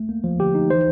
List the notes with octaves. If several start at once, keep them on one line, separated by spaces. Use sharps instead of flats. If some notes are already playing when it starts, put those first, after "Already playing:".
Already playing: A3
A#3
F3
D3 G4
D#4
E3 C5